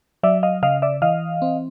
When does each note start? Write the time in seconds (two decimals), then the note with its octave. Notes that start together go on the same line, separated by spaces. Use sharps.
0.23 F#3 D5 E5
0.43 D#5 F5
0.63 C#3 D#5 F5
0.82 D5 E5
1.02 E3 D#5 F5
1.42 C4